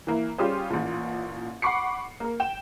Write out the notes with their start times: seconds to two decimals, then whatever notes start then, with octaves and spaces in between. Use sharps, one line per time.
0.07 E3 A#3 E4
0.38 G3 C#4 F4 G4 G#4 C5
0.70 A1 A#2
1.62 F#5 B5 C#6 D6 C7 C#7
2.20 A#3 A#4
2.40 G5 E7